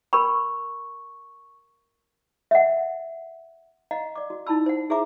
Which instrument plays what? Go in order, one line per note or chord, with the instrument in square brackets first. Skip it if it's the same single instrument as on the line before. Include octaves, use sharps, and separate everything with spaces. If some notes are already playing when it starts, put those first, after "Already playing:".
[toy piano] A#4 B5 [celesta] C#6
[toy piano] E5 F#5
D#5 F5 F#5 A#5
D5 D6
F#4
D#4 E4 A5 B5 E6
C5 F#5
E4 G#4 C5 E5 A#5 D6